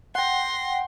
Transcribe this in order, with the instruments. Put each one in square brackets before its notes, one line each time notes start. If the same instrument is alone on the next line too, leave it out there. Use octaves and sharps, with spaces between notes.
[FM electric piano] F#5 G5 [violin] C6 A#6